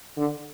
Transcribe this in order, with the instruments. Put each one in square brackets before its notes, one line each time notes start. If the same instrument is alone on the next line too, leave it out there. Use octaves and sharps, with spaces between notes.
[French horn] D3